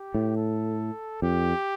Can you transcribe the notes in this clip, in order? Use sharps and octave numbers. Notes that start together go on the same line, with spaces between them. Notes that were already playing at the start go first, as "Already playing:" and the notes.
Already playing: G4
A2
A4
F2 G4